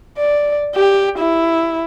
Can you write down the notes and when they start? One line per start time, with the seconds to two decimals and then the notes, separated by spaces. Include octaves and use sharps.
0.18 D5
0.75 G4
1.19 E4